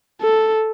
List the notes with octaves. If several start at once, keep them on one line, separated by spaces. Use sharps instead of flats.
A4